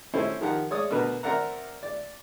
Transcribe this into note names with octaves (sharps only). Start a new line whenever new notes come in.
C4 C#4 E4 A4 C5
D#3 F3 G4 A#4 F#5
G#3 C#5 D5 D#6
B2 D3 A#4 B4
C4 A#4 D5 E5 F#5 A#5
D5